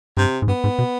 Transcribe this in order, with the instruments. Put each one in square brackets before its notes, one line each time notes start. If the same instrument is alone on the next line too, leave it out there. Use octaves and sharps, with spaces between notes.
[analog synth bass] G2 [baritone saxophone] C3
[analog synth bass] G#2
[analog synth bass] G2 [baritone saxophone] B3
[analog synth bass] G#2
B2